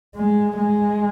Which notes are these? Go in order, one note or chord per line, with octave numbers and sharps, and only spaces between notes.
G#3
G#3